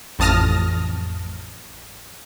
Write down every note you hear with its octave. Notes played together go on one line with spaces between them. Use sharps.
A1 F2 A5 D#6 F6 A#6